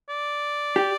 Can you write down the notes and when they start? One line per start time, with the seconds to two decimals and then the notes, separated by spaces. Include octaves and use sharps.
0.09 D5
0.76 G4